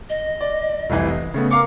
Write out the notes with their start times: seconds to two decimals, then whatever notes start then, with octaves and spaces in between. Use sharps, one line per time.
0.10 D#5
0.41 D5
0.90 F1 C2 E3
1.09 D#5
1.34 C#3 A3 B3
1.51 A#4 F5 D6 C#7